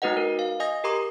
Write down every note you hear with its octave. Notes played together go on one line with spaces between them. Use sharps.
A3 D#4 F#4 B4 D#5 F#5
A#4
F5
D#5 G#5 D#6 A#6
G4 A#4 A#5 C6 D6 D#6